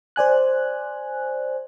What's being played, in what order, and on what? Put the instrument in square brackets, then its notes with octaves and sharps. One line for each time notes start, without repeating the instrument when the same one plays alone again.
[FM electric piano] C5 D5 G#5 F#6